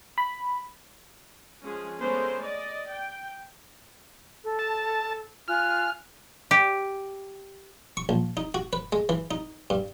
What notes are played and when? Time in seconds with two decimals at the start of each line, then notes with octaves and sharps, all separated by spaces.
0.18 B5
1.65 F3 G#3 C#4 G#4
2.00 G#3 A3 B3 C#4 A#4 C5
2.42 D5 D#5
2.90 G5
4.43 A4
4.59 A5
5.48 F4 G#5 F6 F#6
6.51 G4
7.97 C#6
8.09 A#1
8.37 D#4
8.54 F#4
8.73 B4
8.92 G#3
9.09 E3
9.31 D#4
9.70 G2